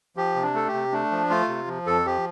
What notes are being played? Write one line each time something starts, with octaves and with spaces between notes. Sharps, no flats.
F3 G4
C3
D4
A3 A4
G4
C3
A3 D4
F3
A3 F4
C3
F3
F2 A4
F3 G4